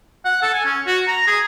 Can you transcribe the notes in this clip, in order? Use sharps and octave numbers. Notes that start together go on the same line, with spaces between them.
F#5
A4
G#5
C#4
F#4
A#5
G#4